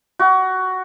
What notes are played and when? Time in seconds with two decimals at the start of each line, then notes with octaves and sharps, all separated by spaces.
0.19 F#4